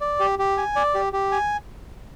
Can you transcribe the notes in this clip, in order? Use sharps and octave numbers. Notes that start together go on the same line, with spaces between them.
D5
G4
G4
G#5
D5
G4
G4
G#5